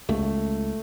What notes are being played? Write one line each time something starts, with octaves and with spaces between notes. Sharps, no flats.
C#2 A3